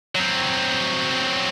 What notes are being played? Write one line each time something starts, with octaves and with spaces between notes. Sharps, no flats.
F#3 C4